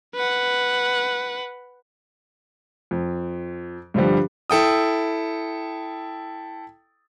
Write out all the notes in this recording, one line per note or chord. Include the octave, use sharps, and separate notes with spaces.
B4 F#5
F2
G2 D3 F3 G3
E4 A4 G5 D#6